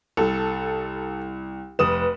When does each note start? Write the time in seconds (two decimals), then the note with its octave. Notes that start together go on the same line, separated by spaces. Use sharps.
0.17 C2 A4
1.79 F1 B4 D#6 E7